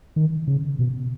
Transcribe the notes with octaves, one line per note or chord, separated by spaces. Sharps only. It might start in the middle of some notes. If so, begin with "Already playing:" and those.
D#3
C#3
B2